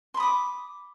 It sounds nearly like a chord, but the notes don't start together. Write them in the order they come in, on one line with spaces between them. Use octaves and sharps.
C6 B5 D#6 D6